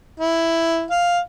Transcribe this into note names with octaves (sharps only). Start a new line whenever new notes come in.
E4
F5